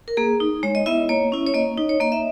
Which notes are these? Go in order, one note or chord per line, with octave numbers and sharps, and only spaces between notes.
A#4
A#3 G#4
D#4
G#3 C#5
D#5
B3 E4 E5
A#3 C#5
C#4 E4
C#5
A#3 D#5
D#4
C#5
A#3 D#5
E5